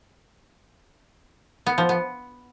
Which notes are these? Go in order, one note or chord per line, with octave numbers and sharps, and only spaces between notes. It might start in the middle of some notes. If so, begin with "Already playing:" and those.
B3
F3
B3